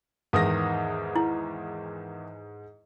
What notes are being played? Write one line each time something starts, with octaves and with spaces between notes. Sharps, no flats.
E2 G#2 D#3 B4 D#6 A#6
E4